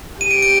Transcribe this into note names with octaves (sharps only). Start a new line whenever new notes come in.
G4 D#7
D7
D7